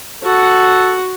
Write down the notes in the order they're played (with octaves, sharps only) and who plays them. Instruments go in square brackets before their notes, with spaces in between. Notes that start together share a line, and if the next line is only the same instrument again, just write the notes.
[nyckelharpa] F#4 F#5 [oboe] A4